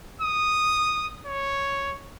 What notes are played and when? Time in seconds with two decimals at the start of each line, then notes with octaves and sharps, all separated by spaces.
0.21 D#6
1.27 C#5